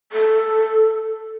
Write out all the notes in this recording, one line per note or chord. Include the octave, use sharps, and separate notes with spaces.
A4